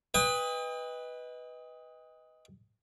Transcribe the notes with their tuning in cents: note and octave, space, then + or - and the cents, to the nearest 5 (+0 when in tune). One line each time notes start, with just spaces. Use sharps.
B4 +0 D#5 +15 G5 +40